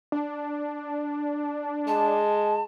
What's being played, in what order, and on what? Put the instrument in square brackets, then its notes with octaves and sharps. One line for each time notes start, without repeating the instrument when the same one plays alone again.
[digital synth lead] D4
[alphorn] G#3 [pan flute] A5